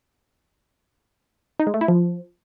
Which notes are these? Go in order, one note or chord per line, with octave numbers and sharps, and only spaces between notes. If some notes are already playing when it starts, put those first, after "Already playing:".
D#4
G#3
A3
E4
F3